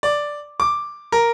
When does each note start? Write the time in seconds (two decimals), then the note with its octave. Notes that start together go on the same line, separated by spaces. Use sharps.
0.03 D5
0.60 D6
1.12 A#4